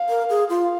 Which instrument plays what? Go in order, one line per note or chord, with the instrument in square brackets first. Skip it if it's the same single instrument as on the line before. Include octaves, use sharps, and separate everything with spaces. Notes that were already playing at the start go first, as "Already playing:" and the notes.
Already playing: [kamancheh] F5
[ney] A#4
G#4
[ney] F4 [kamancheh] F5